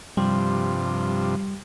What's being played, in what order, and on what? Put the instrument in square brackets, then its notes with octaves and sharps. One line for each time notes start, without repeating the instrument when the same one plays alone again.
[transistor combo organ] G2 C3 F3 [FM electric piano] G3